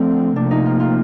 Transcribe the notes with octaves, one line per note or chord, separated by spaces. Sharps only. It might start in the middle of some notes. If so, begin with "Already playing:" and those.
Already playing: D3 F3 A3 C4
C3 F3 A#3 D4
D#4
F4
F4